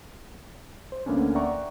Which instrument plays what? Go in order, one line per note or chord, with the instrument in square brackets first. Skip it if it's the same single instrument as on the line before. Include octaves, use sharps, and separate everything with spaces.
[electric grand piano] C5
D2 D3 A#3 B3 C#4 D4
D5 E5 F#5 G5 A#5 C#6